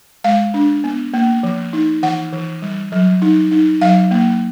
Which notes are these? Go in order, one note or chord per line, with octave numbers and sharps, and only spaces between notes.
G#3 F5
D4
B3
A#3
F3
D#4
E3 F#5
E3
G3
F#3
D#4
D#4
F#3 F5
A#3